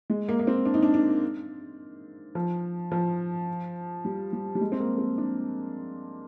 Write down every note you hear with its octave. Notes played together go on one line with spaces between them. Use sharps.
G#3
A#3
A#3
C4
D4
D#4
D4
D4
F3
F3
G3
G3
G3
G#3
C4
A#3
C4
D4